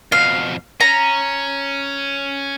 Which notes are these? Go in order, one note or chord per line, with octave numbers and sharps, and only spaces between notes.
F2 B2 F5
C#4 A#5